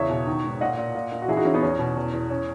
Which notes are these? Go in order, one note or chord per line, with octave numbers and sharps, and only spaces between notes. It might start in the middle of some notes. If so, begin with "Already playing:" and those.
Already playing: E2 C#3 C#5 E5
B2
D#3
G#2
A#2 D#5 F#5
A#2
A#2
A#2
F#4
E3 E4 G#4
D#4 F#4
E3 C#4 E4
B3 D#4
E2 C#4
B2
E2
E2
C#4